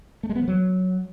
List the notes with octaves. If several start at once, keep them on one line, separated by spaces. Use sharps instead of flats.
A3
G#3
B3
F3
F#3